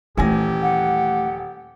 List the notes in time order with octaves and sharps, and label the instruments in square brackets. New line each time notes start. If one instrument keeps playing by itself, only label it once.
[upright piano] D#1 G#5 A#6 [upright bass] E3 A3 [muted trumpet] G4
[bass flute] F#5